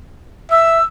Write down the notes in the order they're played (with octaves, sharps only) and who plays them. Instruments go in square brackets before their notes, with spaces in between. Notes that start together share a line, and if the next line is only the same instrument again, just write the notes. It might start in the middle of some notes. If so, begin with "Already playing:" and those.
[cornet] E5 [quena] E6